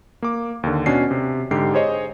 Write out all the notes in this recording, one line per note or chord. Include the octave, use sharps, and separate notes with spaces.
A#3 D6
D#2 D3
B2 C#4 D4 C7
C3
G#2 D3 G4 C7
G#4 C5 C#5 D#5